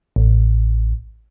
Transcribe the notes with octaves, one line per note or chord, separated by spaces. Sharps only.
A1